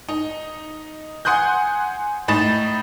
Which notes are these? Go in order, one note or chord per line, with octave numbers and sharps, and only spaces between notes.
D#4
F#5 G#5 C6 D#6 F#6 G6
A2 D#4 B5 A6 E7